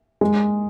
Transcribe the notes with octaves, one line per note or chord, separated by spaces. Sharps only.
G#3